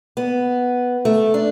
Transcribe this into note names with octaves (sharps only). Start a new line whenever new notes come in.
B3
A3
D4